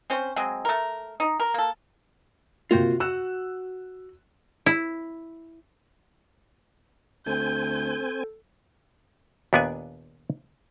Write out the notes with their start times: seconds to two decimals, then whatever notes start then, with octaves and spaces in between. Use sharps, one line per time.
0.10 C4 C#4 C5
0.36 F#3 G#3 C4
0.65 A3 A#4
1.20 D#4
1.40 A#4
1.54 A#3 A4
2.71 C3 A#3 F4 F#4 G5
3.00 F#4 E6 F#6 E7
4.66 E4
7.26 D2 C4 A4 G#5 G6
9.53 D#2 A#2 B3 D4 D5 G#5